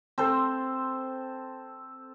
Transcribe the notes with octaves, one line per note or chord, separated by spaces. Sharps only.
C4 A4 C5